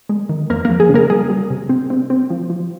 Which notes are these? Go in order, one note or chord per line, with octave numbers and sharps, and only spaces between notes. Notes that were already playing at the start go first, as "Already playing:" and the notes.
G#3
D#3
F2 A#3 A#4
A#3 A#4
F3
G#4
C#3
A#3 A#4
G3 G#4
G3
C3
C4
C4
C4
F3
F3